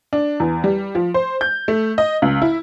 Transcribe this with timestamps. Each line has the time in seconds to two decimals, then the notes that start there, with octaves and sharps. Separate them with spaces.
0.13 D4
0.40 E2
0.64 G3
0.95 F3
1.14 C5
1.41 G6
1.68 A3
1.98 D#5
2.22 C#2
2.42 E4